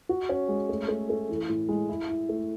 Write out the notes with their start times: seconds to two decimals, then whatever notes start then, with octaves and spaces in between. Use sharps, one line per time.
0.09 F#4
0.29 C#4
0.48 G#3
0.69 A3
0.88 A3
1.10 A3
1.29 E3
1.49 A2
1.69 G#3
1.89 E4
2.08 E4
2.29 A3